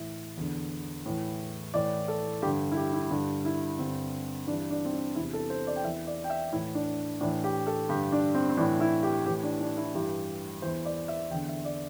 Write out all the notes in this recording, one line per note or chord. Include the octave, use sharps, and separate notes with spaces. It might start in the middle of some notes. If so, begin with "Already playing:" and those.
Already playing: A2 E3 E5
E2 D3
A2 E3
A2 E3 D5
A4
G2 D3 G4
E4
G4
E4
G2 D3
E4
G2 D3 C4
G2 E3 D4
D4
C4
D4
E2 C3 E3 E4
A4
C5
D5
G5
E2 E3 E5
D5
G5
E5
A2 E3 E4
D4
A2 E3 D4
G4
A4
G2 D3 G4
D4
C4
C4
A2 E3 D4
E4
G4
A2 E3 G4
D4
D4
E4
G2 E3 G4
E2 E3 C5
D5
E5
E2 D3 G5
E5
D5